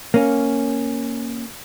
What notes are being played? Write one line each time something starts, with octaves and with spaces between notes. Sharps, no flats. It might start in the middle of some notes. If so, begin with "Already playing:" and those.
A#3 C#4